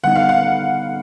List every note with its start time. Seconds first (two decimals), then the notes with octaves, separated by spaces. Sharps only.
0.03 D3 G3 B3 D#4 F#5
0.15 F5
0.29 F#5